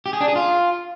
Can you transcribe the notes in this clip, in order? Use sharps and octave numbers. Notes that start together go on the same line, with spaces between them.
G4
G#4
D4
G#4
F4